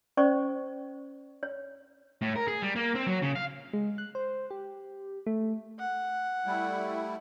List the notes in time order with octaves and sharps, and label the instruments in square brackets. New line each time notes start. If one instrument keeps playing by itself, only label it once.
[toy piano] C#4 C5 D5 C#6
C#5
[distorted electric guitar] A2
A#4
G#4
G3
A#3
C4
F#3
C#3
F5
[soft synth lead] G#3
F#6
C5
G4
A3
[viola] F#5
[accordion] G3 A3 E4